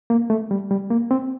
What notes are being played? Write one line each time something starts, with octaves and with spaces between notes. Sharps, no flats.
A#3
A3
G3
G3
A#3
C4